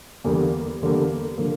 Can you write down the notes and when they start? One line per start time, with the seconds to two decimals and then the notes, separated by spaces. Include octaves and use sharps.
0.24 E2 D3 G3 A#3
0.81 E2 D3 G3 A#3
1.38 D3 F3 A#3